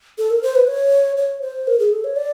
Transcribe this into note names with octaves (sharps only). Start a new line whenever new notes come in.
A4
A#4
C5
B4
C#5
C#5
C5
A#4
G#4
A4
C#5
D5